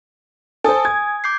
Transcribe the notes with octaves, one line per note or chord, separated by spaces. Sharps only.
A4 C5 G#5 D#6
G#6
D6 G6 C7